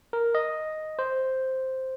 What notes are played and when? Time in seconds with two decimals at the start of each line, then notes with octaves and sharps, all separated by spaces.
0.13 A#4
0.35 D#5
0.99 C5